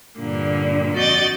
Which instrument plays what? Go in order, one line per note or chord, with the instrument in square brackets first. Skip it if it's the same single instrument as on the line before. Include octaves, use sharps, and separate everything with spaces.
[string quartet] G2 A#2 D3 A#3
F2 F#4 D5 D#5 G6 A6